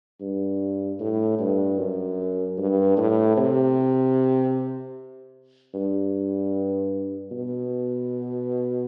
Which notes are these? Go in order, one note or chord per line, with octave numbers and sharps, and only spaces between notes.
G2
A2
G2
F#2
G2
A2
C3
G2
B2